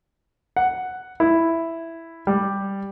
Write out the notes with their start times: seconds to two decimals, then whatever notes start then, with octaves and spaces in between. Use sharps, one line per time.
0.57 F#5
1.20 E4
2.27 G3